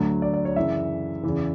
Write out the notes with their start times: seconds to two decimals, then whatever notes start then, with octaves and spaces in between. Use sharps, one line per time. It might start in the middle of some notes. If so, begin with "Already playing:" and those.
Already playing: D2 D3 F#3
0.22 D5
0.34 D5
0.45 C#5
0.56 F#2 C#3 E3 E5
1.23 E2 C#3 E3